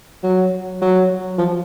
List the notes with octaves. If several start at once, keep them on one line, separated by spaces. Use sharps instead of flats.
F#3
F#3
F3